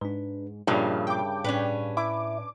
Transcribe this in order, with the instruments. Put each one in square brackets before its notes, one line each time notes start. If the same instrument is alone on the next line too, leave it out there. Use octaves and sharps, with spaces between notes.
[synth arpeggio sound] G#2 [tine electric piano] D4 B4
[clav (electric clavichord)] G2 C#3 [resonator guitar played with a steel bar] A#2 F3 [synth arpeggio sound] D#4 [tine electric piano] A#4 E5
[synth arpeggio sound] G5 D6
[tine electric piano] A2 [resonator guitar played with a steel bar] C#4 D4 B4
[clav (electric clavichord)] E4 [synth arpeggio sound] D6